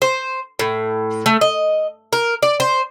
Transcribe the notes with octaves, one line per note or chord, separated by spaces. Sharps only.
C5
A2
A3
D#5
A#4
D5
C5